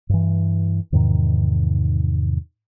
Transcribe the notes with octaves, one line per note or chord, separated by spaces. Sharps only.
G2 E3
E2 G#2 C3 D#3